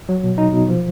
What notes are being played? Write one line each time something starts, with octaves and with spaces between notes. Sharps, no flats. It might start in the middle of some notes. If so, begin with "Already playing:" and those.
F#3
B2
D#4
B2
F3